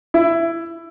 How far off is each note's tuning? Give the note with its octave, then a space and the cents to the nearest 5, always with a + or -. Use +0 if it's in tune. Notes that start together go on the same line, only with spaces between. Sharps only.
E4 +15